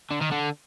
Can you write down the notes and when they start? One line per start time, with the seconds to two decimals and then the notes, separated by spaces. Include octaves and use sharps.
0.11 D3
0.21 D#3
0.31 D3